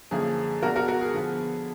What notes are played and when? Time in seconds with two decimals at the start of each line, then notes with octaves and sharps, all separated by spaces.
0.11 F#2 D3 F3 A#3 G#4
0.62 B2 G#3 D4 F#4 A#4
0.76 F#4 A#4
0.88 F#4 A#4
1.01 G#4
1.14 D3 F3 B3